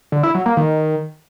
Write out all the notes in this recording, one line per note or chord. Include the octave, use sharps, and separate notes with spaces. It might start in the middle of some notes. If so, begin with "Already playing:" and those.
D3
E4
F#3
A#3
D#3